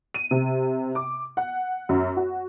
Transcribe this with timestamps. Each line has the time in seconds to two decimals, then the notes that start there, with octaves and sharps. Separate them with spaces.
0.14 D#7
0.31 C3
0.95 D6
1.37 F#5
1.89 F#2
2.17 F#4